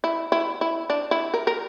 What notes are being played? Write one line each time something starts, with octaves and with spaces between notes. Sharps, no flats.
E4
E4
E4
D4
E4
A#4
A#4